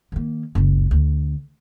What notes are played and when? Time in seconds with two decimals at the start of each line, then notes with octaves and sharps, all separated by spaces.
0.12 D#3 A#3
0.55 F#1 C#2
0.91 D2